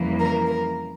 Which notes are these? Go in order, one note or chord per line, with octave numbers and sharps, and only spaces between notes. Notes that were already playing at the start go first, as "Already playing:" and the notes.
Already playing: F2 C#3 E3 G3 A#3
A#4
A#4